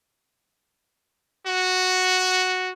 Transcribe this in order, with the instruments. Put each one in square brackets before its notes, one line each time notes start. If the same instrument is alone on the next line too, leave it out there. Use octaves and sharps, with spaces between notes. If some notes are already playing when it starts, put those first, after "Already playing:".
[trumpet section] F#4